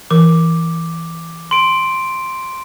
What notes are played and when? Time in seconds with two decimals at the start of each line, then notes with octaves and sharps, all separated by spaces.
0.11 E3 A#4 D6
1.51 C6 D7